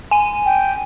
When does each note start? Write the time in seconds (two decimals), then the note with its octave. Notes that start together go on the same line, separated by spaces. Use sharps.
0.11 G#5 D#7
0.46 G5